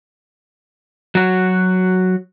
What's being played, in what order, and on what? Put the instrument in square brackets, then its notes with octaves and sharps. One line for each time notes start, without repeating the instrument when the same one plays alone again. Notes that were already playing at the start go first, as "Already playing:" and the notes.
[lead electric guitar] F#3 F#4